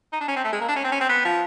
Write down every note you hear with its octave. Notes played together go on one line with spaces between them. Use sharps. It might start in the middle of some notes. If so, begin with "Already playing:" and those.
D#4
D4
C#4
C4
A3
G#3
A#3
D4
C#4
C4
C#4
C4
B3
F3